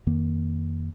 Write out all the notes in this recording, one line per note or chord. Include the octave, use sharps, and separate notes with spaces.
F2 D#3 A#3